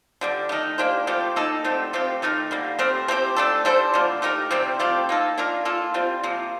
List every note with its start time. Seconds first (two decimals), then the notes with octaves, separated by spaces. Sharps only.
0.21 D3 G3 D4
0.49 D#3 A3 D#4
0.78 A#3 D4 G4 C5
1.07 F3 A3 C4 G4
1.36 A#3 D#4 A4
1.65 D3 A3 C4 G4
1.93 F3 A3 C4 G4
2.22 D#3 A3 D#4 A#4
2.51 D3 G3 A#3
2.79 A3 C4 G4 A#4
3.08 A3 C4 G4 C5
3.36 A3 D4 A4
3.65 G3 D4 A4 C5
3.94 D3 F3 A#3
4.22 A3 D#4 G4 A#4
4.51 C3 G3 C4 G4
4.79 F3 A3 C4 G4
5.09 A#3 D#4 A4
5.38 A#3 D4 F4 A#4
5.65 A#3 F4 A4
5.94 G3 C4 F4
6.23 C3 F3 A#3